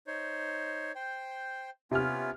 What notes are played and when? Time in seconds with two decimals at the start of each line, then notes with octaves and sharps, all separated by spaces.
0.07 D#4 C5 C#5
0.95 C5 G5
1.91 C3 B3 C#4 F4 F6